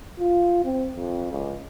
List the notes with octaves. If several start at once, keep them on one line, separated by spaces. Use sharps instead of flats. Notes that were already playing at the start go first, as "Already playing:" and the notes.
F4
C4
F2
C#2